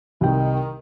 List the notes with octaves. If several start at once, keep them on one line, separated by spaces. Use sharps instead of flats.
C2 D#3 G5